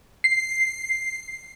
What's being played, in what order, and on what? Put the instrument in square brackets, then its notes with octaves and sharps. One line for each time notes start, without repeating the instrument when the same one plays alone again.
[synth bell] C7